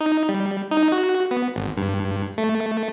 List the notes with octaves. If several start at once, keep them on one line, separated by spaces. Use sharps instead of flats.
D#4
G3
D#4
F#4
B3
G#1
G2
A3